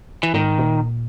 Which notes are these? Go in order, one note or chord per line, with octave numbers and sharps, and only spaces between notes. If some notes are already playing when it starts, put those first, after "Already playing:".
E3
G#2 D#3
A#2